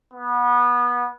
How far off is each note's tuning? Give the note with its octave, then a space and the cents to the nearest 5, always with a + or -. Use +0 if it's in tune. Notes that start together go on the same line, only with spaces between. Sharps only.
B3 -25